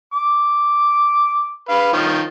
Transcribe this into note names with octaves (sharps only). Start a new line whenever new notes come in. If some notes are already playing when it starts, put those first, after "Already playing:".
D6
B4 F5
D#3 F3 C#5